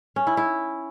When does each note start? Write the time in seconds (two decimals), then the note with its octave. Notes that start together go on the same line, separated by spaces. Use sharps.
0.16 C#4
0.27 E4
0.37 E4